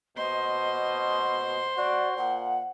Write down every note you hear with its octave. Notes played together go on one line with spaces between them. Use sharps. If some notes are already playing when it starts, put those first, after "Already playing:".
B2 C5 D#5 C6
F#4 D5
A#2 F#5